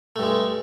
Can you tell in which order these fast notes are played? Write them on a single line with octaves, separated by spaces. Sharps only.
A3 G2 G#3